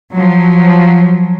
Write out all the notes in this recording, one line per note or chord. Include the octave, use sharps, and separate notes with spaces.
F3 F#3